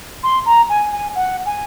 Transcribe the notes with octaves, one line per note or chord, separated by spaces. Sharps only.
C6
A#5
G#5
G#5
F#5
G#5